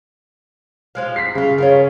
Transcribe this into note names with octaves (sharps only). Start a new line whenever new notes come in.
F3 G#3 F5
B6 C7
C#3 E4 F4
C#3 C#4 F4 A#4